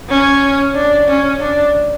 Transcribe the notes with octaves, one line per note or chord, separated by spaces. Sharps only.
C#4
D4
C#4
D4